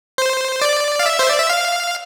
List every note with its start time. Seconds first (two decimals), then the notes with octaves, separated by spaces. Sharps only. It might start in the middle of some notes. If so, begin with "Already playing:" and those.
0.18 C5
0.61 D5
0.99 F5
1.06 E5
1.19 C5
1.30 D5
1.39 E5
1.49 F5